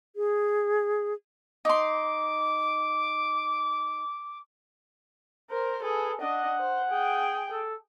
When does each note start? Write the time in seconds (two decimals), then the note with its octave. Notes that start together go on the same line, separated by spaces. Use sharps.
0.16 G#4
1.65 D#4 C6 D6
5.50 A#4 C5
5.83 G#4 A4 B4
6.21 D4 D#5 F#5
6.60 C5
6.90 G#4 G5
7.51 A4